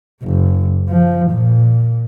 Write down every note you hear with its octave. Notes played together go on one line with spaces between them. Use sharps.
F#1
F3
A#2